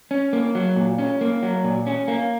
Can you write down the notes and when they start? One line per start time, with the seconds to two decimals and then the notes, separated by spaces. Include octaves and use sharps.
0.11 C#4
0.33 A#3
0.55 F#3
0.76 A#2
0.99 C#4
1.21 A#3
1.43 F#3
1.64 A#2
1.87 C#4
2.08 A#3